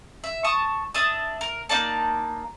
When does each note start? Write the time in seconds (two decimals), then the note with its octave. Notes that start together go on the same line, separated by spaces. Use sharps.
0.24 E5
0.44 A5 C#6 D#6
0.94 D4 E5 D#6
1.41 A#4
1.69 A#3 D#4 D5 A5